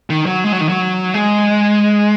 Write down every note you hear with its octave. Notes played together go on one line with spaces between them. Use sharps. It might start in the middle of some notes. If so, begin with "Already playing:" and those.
D#3
F#3
G#3
F#3
D#3
F#3
G#3